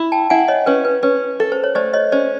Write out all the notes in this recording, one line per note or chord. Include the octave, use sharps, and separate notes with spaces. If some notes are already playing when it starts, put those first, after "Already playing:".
Already playing: E4
G5 A5
E4 F#5 G#5
C#5 D#5
C#4 B4 C#5
B4
C#4 B4
A4
C5
C#5
A3 C5 D5
C#5 D#5
C#4 C5 D5